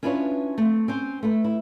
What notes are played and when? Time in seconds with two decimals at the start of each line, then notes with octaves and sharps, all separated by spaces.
0.03 C#4 D4 E4 F4 B4 C#5
0.58 A3 C4
0.88 C4 C#4 C5
1.23 A3 B4
1.44 E4